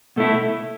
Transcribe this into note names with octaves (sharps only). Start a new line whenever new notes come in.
B2 A3 E4